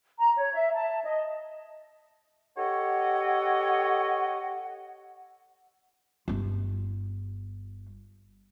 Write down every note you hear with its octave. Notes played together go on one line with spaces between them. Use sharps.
A#5
C#5
E5
A5
D#5
G4 A4 C#5 D#5 F#5
G1 F4